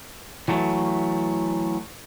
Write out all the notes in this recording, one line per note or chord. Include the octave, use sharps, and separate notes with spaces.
E3 F#3 A3